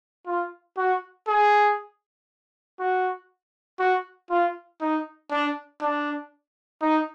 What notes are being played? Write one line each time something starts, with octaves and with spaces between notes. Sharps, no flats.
F4
F#4
G#4
F#4
F#4
F4
D#4
D4
D4
D#4